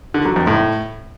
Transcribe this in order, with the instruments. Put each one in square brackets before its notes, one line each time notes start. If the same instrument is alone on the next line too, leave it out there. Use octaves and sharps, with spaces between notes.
[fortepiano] D3
F#3
F2
A2